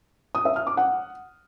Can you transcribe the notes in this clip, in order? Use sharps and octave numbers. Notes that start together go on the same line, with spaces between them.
D#6
E5
F6
D6
F#5